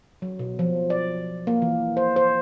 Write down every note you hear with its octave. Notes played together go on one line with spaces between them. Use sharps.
F#3
B2
F3
D5
A#3
E3
C5
C5